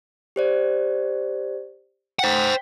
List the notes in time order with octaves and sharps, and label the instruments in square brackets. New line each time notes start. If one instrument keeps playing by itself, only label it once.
[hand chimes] G4 C5 D5
[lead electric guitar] C5 F#5 [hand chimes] G5 B6